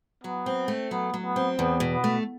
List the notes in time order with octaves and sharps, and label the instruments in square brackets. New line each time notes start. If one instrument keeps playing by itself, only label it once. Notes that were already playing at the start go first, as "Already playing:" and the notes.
[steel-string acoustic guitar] F#3 [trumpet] B3
[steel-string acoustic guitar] C4
A3
[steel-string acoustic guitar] F#3 [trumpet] B3
[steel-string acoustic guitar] F#3
[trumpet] B3
[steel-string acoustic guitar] C4
[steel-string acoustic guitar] E2 [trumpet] B3
[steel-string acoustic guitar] B2
[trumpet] B3
[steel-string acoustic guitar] A3